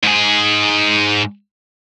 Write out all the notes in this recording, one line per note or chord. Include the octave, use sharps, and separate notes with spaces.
G#2 G#4